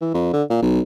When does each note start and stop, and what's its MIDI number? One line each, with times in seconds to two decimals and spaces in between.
0.01 0.09 52
0.14 0.32 41
0.33 0.43 50
0.50 0.62 46
0.62 0.80 35